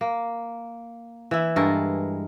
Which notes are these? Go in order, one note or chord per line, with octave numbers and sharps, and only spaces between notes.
A#3
E3 E4
G2 G#3 A4 A#4